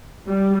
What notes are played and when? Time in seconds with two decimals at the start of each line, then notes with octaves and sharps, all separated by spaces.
0.28 G3